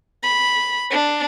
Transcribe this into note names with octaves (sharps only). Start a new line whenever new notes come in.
B5
D4